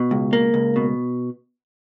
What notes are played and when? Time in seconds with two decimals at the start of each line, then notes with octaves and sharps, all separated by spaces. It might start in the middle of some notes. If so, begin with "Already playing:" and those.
Already playing: B2
0.11 C#2
0.33 A#3
0.54 C#2
0.76 B2